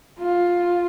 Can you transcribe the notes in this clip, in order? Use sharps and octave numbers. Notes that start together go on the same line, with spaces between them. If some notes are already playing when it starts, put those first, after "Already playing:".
F4